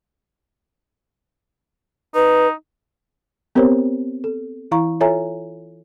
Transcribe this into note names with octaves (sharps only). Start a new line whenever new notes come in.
D#4 B4
B3 C4 G4 A#4 C5 C#5
A4
E3 E4 F5 A#5 C#6
F4 A4 C#5 E5 G#5 A#5